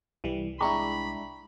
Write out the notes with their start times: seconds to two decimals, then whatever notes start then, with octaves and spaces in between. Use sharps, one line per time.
0.24 C2 E3 G3
0.60 G#3 D4 E4 G5 A#5 B5 C#6